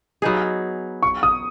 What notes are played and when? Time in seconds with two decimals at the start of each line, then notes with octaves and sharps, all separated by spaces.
0.22 F#3 B3 D#4 G#4
1.03 C#6
1.23 D#6